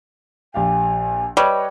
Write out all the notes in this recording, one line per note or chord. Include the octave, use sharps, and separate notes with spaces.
A#1 G4 F5 G#5
G3 B4 C#5 D#5